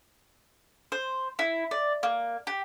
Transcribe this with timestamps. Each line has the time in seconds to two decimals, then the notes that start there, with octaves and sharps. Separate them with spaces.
0.92 C5
1.39 E4
1.71 D5
2.03 A#3
2.47 G4